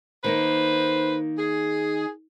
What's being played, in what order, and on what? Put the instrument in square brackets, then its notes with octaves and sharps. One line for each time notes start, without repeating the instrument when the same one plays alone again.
[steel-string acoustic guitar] D#3 A#3 D#4 [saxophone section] B4 C5
[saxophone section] G#4